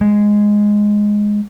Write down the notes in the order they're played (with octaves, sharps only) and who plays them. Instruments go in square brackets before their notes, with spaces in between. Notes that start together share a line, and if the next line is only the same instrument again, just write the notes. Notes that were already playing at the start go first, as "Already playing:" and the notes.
[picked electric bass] G#3